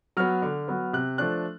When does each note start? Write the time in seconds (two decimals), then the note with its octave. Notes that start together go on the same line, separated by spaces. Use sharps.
0.17 F#3 B3 F6
0.42 D3
0.68 F#3 B3
0.93 C3 F#6
1.18 F3 A3 D4 F#6